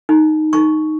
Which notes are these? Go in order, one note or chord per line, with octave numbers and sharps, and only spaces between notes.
D#4
D#4 C#6